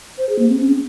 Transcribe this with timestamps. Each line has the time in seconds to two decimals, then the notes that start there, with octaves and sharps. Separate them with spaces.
0.18 C5
0.29 G#4
0.39 A#3
0.49 C4
0.60 C#4
0.70 C4